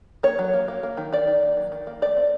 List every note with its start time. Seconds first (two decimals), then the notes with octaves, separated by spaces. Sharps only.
0.23 A#3 C#5
0.39 F#3
0.53 A#3
0.68 A#3
0.83 A#3
0.97 D#3
1.12 D#3 D5
1.27 D#3
1.43 A#3
1.57 F#3
1.72 D#3
1.87 A#3
2.02 A3 D5
2.17 C4